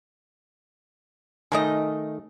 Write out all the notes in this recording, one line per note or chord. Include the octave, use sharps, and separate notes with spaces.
D#3 A3 D#4 G#4 A#4 D#5